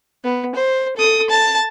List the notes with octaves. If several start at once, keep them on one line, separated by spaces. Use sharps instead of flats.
B3
C5
A4 D#6
A5